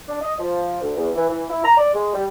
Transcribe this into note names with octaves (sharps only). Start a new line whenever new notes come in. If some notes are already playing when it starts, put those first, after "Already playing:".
D4
D#5
F3
D2
E2
E3
E3
E4
A#5
D5
G#3
G3